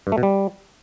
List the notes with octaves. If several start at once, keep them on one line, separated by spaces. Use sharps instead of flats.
G2
A3
B2
G3